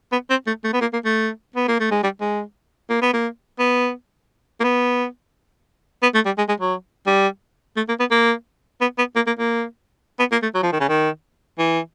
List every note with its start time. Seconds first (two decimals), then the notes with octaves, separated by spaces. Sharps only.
0.12 B3
0.30 C4
0.47 A3
0.64 A3
0.73 B3
0.81 A#3
0.93 A#3
1.05 A3
1.56 B3
1.68 A#3
1.80 A3
1.91 G#3
2.03 G3
2.21 G#3
2.90 A#3
3.02 B3
3.13 A#3
3.60 B3
4.60 A#3
4.64 B3
6.02 B3
6.15 A3
6.26 G3
6.38 G#3
6.49 G#3
6.60 F#3
7.07 G3
7.77 A3
7.88 A#3
8.00 B3
8.11 A#3
8.81 B3
8.98 B3
9.16 A#3
9.27 A#3
9.39 A#3
10.19 B3
10.32 A#3
10.42 A3
10.54 F#3
10.63 F3
10.72 D#3
10.80 C#3
10.89 D#3
11.59 E3